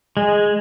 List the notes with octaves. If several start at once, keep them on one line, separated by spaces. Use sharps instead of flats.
G#3